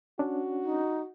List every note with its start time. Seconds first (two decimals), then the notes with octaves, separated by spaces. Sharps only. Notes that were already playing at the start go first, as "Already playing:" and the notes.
0.19 C#4 D4 F#4
0.63 D#4